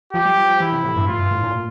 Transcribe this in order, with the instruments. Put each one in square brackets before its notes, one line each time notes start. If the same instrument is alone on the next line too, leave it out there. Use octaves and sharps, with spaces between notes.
[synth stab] F3 [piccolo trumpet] G4
[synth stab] G3
F3
F3
[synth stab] E3 [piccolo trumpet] E4
[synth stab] C3
A2
G2
[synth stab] A2 [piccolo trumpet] F4
[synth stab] G2
A2
A#2